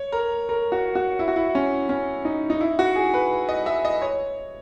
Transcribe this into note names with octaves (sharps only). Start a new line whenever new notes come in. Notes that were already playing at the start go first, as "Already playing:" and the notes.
Already playing: C#5
A#4
A#4
F#4
F#4
E4
F#4
E4
C#4
C#4
D#4
D#4
E4
F#4
G#4
B4
D#5
E5
D#5
C#5